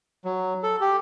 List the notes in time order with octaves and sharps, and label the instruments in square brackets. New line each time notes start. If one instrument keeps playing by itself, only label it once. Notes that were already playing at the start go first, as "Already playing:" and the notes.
[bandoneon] F#3
A4
G4